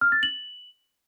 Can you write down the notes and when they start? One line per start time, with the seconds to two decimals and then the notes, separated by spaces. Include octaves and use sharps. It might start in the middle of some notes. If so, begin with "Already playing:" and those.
0.01 F6
0.12 A6
0.23 F#7